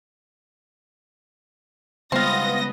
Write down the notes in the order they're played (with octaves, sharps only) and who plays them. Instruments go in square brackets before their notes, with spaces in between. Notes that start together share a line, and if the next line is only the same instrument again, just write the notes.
[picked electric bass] C#3 G3 G#3 [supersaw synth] B3 [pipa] C4 F4 [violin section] D#5 A#6